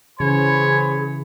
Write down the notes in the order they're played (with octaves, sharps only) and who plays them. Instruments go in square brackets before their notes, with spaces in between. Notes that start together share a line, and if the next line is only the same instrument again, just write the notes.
[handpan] C#3 E3 [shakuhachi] G#4 [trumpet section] C5 G#5 B5 [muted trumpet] C#5